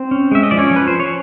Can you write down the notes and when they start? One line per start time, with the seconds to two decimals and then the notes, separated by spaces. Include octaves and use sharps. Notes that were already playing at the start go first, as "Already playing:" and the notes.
Already playing: C4 C5
0.11 C#4
0.32 G#3 E5
0.43 D#5
0.51 F3 D5
0.58 C#4 C#5
0.71 F3
0.76 B4
0.88 C#4 C5
1.00 C#5